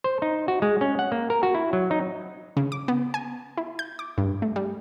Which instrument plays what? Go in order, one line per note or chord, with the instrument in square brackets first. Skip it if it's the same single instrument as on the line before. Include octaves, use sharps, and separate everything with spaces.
[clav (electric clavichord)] C5
D#4
F#4
G#3
C#4
F#5
A#3
A#4
F#4
E4
F#3
D#4
[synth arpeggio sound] C#3
D6
B3
G#5
E4
G6
D6
G2
A3
G3